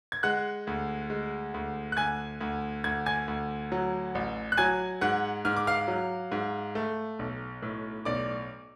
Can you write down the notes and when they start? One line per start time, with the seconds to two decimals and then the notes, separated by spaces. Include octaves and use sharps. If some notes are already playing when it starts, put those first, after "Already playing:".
0.12 G#6
0.23 G#3 F#5 F#6
0.67 D2
1.10 G#3
1.54 D2
1.92 F#6
1.97 D2 G#5 G#6
2.41 D2
2.84 D2 G#6
3.06 G#5 G#6
3.28 D2
3.72 F#3
4.15 A1
4.52 F#6
4.57 F#3 G#5 G#6
5.01 G#2 F#5 F#6
5.45 G#2 F6
5.56 D6
5.67 F5 F6
5.88 F#3
6.32 G#2
6.75 A3
7.19 B1
7.62 A2
8.05 B1 D5 D6